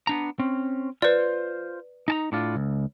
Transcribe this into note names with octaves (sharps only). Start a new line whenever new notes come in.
B3 D4 A#5
C4 C#4
F4 B4 C5 D5
D#4 A5 A#5
A2 D4 F4
C#2